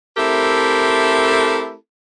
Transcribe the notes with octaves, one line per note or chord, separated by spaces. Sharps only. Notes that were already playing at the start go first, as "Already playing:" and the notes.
A3 C4 E4 G4 A4 A#4